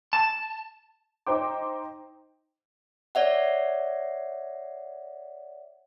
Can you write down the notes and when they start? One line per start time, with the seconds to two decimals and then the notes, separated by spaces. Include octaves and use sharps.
0.13 A5
1.27 D#4 C5 G5 D6
3.15 C#5 D5 E5 F#5